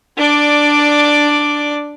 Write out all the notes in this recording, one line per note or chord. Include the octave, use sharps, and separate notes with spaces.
D4 D5